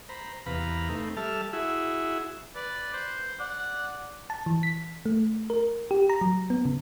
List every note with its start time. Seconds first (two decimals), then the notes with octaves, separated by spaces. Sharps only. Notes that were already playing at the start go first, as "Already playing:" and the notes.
0.09 C5 A#5 B5
0.46 E2 C3 B4 F5 A#5 B5
0.89 A3 C4 D#4
1.17 G3 A4 E5 A5 F6
1.53 E4 F#4 G#4 E5
2.55 B4 D5
2.94 C5
3.40 D5 F#5
4.30 A5
4.46 E3
4.63 B6
5.06 A3
5.50 A#4
5.91 G4
6.10 A#5
6.21 F#3
6.50 B3
6.65 C#3